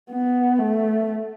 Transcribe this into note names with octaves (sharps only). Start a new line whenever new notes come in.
B3
A3